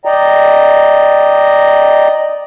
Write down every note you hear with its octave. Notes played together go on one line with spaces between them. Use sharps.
D5 D#5 G5 A#5